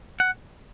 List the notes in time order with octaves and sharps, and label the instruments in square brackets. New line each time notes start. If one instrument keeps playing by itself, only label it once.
[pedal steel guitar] F#5